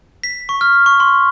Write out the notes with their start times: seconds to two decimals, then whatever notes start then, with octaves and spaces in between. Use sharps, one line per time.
0.24 B6
0.49 C#6
0.61 F6
0.86 C#6
1.00 C6